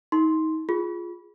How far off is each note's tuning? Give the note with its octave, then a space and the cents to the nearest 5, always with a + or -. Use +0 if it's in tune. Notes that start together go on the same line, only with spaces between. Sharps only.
D#4 +30 C6 +0
F4 +0 G#4 +0